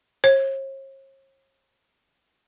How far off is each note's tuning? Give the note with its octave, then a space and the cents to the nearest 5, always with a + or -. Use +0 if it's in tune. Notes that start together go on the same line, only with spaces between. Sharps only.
C#5 -45